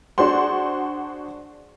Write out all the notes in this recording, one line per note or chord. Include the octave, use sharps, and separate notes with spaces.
D4 F#4 G#4 C5 F#5 C6